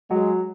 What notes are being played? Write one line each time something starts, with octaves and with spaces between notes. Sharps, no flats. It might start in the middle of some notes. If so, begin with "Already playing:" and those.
F#3 G#3